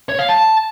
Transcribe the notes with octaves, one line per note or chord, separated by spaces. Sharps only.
C#5
F5
A5